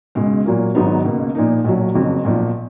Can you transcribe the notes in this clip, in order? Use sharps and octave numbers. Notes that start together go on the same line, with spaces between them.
C#2 B2 G#3
A#2 F#3 A#3 F4
G#1 G#2 F#3 B3 D#4
C#2 B2 A#3
A#2 F3 A#3 D#4
B1 A#2 F#3
F#1 F2 C#3 F#3
B1 A#2 F3